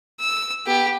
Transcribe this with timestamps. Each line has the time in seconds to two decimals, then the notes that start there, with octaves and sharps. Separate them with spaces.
0.20 E6
0.66 B3 G4